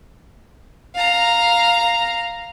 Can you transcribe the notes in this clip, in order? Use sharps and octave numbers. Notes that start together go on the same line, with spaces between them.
F5 A#5